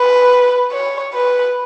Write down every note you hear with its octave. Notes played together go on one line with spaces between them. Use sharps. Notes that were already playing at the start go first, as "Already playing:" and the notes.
Already playing: B4
C#5
B4